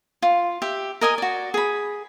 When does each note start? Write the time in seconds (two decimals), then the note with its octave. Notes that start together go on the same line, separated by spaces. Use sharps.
0.22 F4
0.62 G4 E5
1.01 A#4 D#5 G#5 D#6
1.18 F#4 D5
1.54 G#4 B5